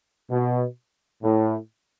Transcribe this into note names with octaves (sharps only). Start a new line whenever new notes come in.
B2
A2